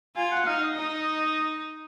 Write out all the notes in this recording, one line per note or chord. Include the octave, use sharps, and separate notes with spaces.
F4 G#5
F#5
D#4 F5
D#5
D#4